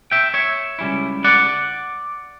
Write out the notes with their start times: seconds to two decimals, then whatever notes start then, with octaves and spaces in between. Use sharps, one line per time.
0.11 E5 G5
0.34 C#5 E5
0.79 C#2 B2 G3 C#4 E4
1.24 D5 F#5